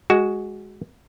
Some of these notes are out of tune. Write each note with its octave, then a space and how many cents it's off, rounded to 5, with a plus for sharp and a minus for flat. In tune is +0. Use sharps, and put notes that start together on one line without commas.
G#3 +0 F#4 +10